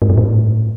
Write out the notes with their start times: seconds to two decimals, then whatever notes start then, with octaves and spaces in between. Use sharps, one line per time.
0.02 G#2
0.10 G2
0.18 A2